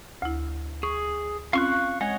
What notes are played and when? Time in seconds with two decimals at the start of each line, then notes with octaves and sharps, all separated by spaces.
0.22 D2 E4
0.83 G#4 C#6
1.53 C4 C#4 F4 F5 C#6 F#6
2.01 G#3 C#5 D#5 F#5 G#6